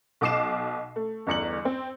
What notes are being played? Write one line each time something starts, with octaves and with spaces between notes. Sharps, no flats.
B1 B2 D6 C7 E7
A3
G1 E2 C#7 F#7
C4